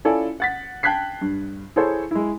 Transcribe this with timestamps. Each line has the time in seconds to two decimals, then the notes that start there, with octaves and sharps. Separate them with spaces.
0.05 C#4 E4 F4 A4 D5 G#5
0.40 F#5 A6 B6
0.83 G5 A5 F#6 G#6 B6 C7
1.21 G2
1.76 E4 G#4 A4 C5 C#5
2.11 G#3 E4